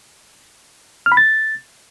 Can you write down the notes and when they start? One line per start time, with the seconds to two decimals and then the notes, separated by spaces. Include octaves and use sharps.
1.06 F6
1.12 B5
1.17 A6